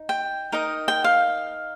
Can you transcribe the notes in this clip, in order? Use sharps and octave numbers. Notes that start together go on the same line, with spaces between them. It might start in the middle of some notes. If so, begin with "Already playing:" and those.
Already playing: D#4
G5
D#4 A#4 D#5
G5
F5